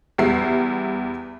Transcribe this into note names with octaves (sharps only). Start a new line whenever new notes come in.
E2 G3 E5 C7